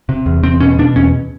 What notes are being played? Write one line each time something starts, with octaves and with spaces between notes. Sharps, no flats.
C3
E2
E2 C4
B2 C#4
B2 D4
E2 C#4